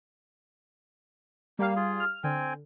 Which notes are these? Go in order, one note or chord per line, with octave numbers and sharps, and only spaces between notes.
G3 A#3 F5
F4 G#4
F6
D3 C4 G5 G#5